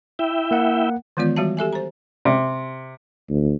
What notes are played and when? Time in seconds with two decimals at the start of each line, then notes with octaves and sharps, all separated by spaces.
0.19 E4 E5 G5
0.51 A#3 F#5
1.17 D#3 E3 G#3 B3 F4 D5
1.36 E3 G3 F#4 F5 A5
1.57 G4 A4 E5 G#5
1.73 C5 A#5
2.25 C3
3.30 D2